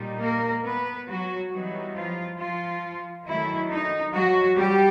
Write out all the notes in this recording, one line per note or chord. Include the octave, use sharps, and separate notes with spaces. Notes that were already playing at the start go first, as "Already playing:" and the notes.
Already playing: A#2 G3 D#4
A#3 A#4
B3 B4
F#3 F#4
E3 F#3 G3 B3 D#4 F#4
F3 F4
F3 F4
D#3 F#3 A3 E4
D#4
F#3 F#4
G3 G4